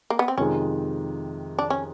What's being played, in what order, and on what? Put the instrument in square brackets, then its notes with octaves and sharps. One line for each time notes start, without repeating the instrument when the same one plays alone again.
[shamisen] A#3
B3
C4
[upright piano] F2 C3 D#3 G#3 [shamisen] C#4
[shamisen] D4
C#4